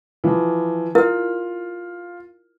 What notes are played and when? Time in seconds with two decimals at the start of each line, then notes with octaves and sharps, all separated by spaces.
0.24 E3 F3
0.95 E4 F4 A#4